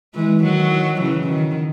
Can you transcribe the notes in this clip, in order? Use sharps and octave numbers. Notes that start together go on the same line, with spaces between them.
E3 G#3
D#3 F#3
C#3 E3
D#3